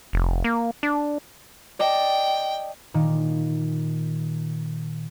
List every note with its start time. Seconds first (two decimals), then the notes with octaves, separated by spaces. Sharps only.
0.13 F1
0.44 A#3
0.83 D4
1.79 D5 D#5 G5 A5
2.94 A#2 D#3